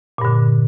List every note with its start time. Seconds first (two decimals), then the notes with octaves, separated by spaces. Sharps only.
0.18 A#2
0.22 G2
0.25 D3